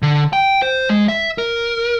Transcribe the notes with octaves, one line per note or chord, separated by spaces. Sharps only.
D3
G5
C5
G#3
E5
A#4